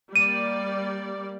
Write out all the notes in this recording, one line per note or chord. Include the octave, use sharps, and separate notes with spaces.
G3 A#3 D5 D#7